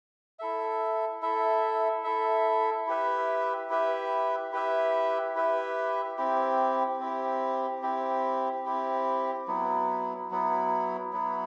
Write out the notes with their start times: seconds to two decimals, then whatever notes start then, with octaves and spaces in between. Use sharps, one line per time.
0.39 E4 A4 E5
1.22 E4 A4 E5
2.04 E4 A4 E5
2.87 E4 G4 B4 E5
3.69 E4 G4 B4 E5
4.52 E4 G4 B4 E5
5.35 E4 G4 B4 E5
6.17 C4 E4 G4
7.00 C4 E4 G4
7.83 C4 E4 G4
8.65 C4 E4 G4
9.47 F#3 B3 E4
10.31 F#3 B3 E4
11.13 F#3 B3 E4